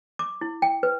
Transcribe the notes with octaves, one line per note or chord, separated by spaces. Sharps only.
D6
E4
G5
B4